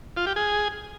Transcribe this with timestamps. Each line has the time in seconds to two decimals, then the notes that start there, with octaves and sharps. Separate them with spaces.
0.17 F4
0.26 G4
0.36 G#4